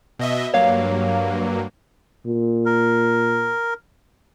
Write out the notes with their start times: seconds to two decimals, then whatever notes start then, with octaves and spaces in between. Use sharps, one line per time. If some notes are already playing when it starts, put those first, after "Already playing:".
0.19 B2 D#5 E5
0.54 G2 F#3 A#3 C#5 F5
2.26 A#2
2.66 A#4